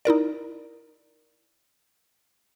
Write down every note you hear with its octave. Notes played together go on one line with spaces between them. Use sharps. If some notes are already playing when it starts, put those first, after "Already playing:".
D#4 E4 A#4 D5